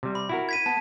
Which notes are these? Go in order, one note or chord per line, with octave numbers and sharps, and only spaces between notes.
C3 G3
B5
E4 F#4 A#4
G#6 B6 D#7
B3 A5